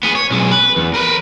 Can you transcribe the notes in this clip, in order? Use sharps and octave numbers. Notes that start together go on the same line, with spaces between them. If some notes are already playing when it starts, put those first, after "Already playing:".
B3 G#4
C#5
B1 G#3
B4
E2
A#4 B4